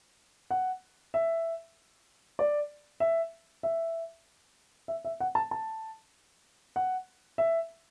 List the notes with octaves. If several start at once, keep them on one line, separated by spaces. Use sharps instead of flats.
F#5
E5
D5
E5
E5
E5
E5
F#5
A5
A5
F#5
E5